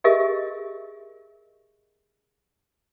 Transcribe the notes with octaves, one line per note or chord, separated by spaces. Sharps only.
G4 G#4 A#4 D#5 E5